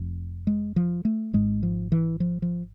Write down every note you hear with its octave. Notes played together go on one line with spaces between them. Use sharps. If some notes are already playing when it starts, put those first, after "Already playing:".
Already playing: F1 F2
G#3
F3
A3
G#1 G#2 G#3
F3
E3
F3
F3